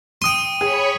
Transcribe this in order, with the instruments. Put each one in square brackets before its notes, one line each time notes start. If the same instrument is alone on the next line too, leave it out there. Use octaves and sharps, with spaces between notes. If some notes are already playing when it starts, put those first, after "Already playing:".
[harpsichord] G5 C6 [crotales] D#6 D#7
[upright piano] G#4 [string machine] C#5 B5 C#6